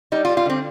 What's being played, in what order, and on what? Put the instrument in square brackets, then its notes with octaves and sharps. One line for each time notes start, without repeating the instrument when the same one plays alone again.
[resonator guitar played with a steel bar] G3 D#4
F4
G3
F4
D3 C4